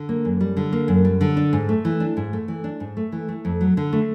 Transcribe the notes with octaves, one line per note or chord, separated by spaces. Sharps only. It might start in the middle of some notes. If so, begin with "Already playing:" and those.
Already playing: D3
A#3
F#2
G3
D3
A#3
F#2
G3
D3
D4
G#2
A3
E3
D4
G#2
A3
E3
D4
G#2
A3
E3
A3
F2
F#3
D3
A3